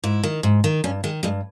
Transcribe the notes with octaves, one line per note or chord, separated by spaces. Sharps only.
G#2 E4
D#3
G#2
D#3
G2 C#4
D#3 G#3
G2 G#3